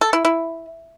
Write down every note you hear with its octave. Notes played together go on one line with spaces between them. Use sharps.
A4
E4
E4